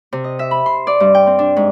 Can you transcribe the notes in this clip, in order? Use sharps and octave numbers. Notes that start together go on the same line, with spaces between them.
C3
D#5
E5
B5
C6
D5
G2
G5
C4
D4
G#2